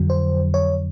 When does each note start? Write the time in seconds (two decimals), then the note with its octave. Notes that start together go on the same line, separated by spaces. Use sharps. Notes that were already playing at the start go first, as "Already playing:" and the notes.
Already playing: F2 D3 F#3
0.10 C5
0.54 C#5